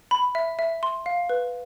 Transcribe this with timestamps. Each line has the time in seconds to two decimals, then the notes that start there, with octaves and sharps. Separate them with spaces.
0.11 B5
0.35 E5
0.59 E5
0.83 C6
1.06 F5
1.30 B4